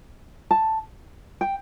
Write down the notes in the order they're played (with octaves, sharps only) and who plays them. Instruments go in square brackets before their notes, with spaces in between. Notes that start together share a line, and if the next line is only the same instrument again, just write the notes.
[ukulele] A5
G5